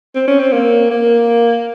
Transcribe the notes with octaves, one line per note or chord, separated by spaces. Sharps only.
C4
C#4
C4
A#3
A#3